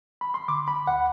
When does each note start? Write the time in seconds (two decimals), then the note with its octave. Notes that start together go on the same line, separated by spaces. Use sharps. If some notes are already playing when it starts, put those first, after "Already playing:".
0.21 B5
0.34 C6
0.48 D3 D6
0.68 B5
0.87 D2 F#5